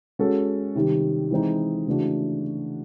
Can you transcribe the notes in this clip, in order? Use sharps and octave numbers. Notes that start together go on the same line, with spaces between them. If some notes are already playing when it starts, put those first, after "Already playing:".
G#3 C#4 F#4 A4
C3 D#3 G3
E3 G#3 C4 D#4
C#3 E3 A3 D4 F#4